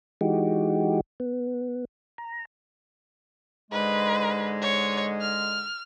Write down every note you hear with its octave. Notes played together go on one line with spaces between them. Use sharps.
E3 G#3 D#4 F#4 G4
B3
A#5
G#2 D3 G#3 B4
C#5
F6